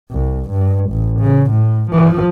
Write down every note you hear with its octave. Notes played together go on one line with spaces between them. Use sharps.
C2
G2
A1
C#3
A2
F3